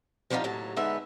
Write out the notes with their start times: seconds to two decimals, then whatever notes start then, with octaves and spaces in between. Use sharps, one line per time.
0.30 F3 G3 B3 D4 D#4 F4
0.44 D#2 A2 F#3 A5
0.76 D3 G#3 B3 D#4 B4 E5